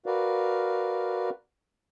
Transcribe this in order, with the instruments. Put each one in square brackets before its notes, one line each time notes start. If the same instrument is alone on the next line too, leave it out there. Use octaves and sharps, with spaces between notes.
[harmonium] F#4 A#4 B4 D5 F5